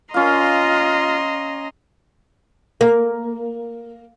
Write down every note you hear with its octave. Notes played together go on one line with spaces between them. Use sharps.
C#4 F4 D#5 F5 A#5 C6
A#3